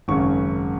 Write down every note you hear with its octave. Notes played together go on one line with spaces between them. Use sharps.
G#1 F#2 C#3 C#6